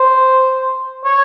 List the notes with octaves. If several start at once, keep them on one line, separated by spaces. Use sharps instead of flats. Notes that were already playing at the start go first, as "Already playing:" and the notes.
Already playing: C5
C#5